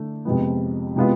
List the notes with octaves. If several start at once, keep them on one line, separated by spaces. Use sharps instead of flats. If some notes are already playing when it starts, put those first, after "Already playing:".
Already playing: D3 A3
F2 C3 F3 G#3 B3
C3 G#3 B3 F4